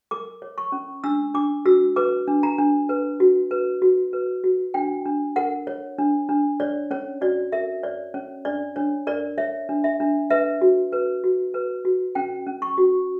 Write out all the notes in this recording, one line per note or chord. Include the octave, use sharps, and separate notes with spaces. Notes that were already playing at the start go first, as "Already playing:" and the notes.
A#4 D6
C#5
C#6
C#4
D4 E6
D4 D6
F#4 E6
B4 D6
D4
A#5
D4
B4
F#4
B4
F#4
B4
F#4
D4 G5
D4
A#4 F#5
C#5
D4
D4
C#5 D5
C#4 C#5
F#4 D5
A#4 E5
C#5 D5
C#4 C#5
D4 D5
D4 C#5
A#4 D5
C#5 E5
D4
E5
D4
B4 E5
F#4
B4
F#4
B4
F#4
C#4 G5
C#4
C#6
F#4